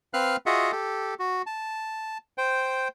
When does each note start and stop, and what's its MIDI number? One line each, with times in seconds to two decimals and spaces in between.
0.14 0.36 60
0.14 0.36 71
0.14 0.36 77
0.14 0.36 89
0.14 0.36 90
0.46 0.72 65
0.46 0.72 66
0.46 0.72 68
0.46 0.72 75
0.46 0.72 76
0.46 0.72 78
0.72 1.14 67
0.72 1.14 69
1.19 1.42 66
1.46 2.18 81
2.38 2.88 72
2.38 2.88 79